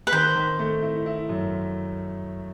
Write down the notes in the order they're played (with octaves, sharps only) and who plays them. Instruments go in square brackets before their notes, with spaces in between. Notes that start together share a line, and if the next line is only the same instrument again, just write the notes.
[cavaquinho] B4
[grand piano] D#3 [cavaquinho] C5
[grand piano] D#3
A3
E4
E4
F#2